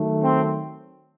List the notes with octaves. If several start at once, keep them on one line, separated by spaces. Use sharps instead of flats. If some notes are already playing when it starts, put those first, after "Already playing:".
Already playing: D#3 F#3 A3
C4